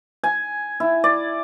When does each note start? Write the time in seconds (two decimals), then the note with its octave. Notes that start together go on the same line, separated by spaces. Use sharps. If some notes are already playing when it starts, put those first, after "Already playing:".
0.24 G#5
0.80 E4
1.04 D5